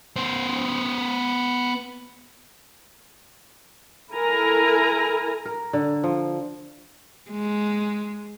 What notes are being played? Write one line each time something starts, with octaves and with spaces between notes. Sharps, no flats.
B3 C5
E4 A4 A#4 G#5 A#5
A#4
D3
F3
G#3